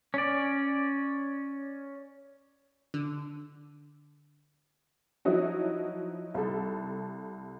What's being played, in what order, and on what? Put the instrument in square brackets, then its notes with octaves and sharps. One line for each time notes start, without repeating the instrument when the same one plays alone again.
[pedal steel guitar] C#4 D5
[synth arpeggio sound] D3
[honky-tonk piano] F3 F#3 D#4 E4 F#4
C2 A4